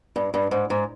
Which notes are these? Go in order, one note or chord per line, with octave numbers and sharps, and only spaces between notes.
G2
G2
G#2
G#2